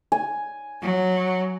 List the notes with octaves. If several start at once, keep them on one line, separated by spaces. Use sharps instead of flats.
G#5
F#3